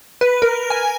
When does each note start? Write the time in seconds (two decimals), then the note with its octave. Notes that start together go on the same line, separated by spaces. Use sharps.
0.21 B4
0.42 A#4
0.70 G#5